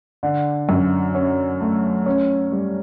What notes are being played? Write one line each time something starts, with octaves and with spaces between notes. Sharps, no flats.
D3
F#2
C#4
A3
C#4
G3